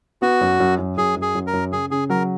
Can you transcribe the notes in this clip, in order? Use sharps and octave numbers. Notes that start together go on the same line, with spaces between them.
B3 F#4
F#2
F#2
F#2
F#2 G#4
F#2
G#4
F#2
A#4
F#2
C#3 G#4
C#3 G#4
F#3 A#4